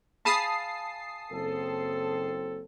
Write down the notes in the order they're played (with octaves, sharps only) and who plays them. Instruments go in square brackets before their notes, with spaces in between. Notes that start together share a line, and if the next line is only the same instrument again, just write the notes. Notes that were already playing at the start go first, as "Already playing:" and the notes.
[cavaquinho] G#4 F5 B5 [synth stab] A5 D#6 C7
[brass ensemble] F#1 C4 A4